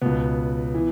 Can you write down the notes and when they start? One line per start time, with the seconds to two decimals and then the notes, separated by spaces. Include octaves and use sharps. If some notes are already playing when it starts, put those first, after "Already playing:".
0.02 C#2 B2 B3
0.74 E3